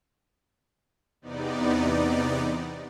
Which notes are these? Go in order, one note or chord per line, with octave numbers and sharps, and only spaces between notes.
E2 C3 B3 D#4 D5